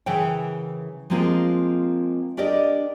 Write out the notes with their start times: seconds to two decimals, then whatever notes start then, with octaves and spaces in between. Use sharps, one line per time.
0.06 C#3 E3 E4 A#4 F#5 G5
1.10 F3 G#3 A#3 C4 F4 A#4
2.37 D4 G4 A#4 D5 D#5